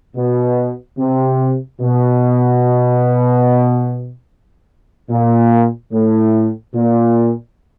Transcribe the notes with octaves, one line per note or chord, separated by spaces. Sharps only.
B2
C3
B2
A#2
A2
A#2